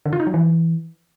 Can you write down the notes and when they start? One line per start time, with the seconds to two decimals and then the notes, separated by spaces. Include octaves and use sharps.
0.06 D3
0.13 F4
0.20 D#4
0.27 F#3
0.34 E3